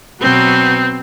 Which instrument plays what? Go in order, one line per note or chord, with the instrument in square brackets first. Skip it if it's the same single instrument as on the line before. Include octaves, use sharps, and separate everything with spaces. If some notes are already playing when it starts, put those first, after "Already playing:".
[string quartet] B2 F#3 B3 C4